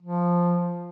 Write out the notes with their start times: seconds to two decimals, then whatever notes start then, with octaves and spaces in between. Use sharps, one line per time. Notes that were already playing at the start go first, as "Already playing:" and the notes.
0.02 F3